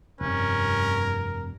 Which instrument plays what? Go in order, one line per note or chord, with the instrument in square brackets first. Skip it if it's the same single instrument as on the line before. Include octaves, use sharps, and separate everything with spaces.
[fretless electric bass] F1 C3 [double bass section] G2 [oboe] C#4 [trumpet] A#4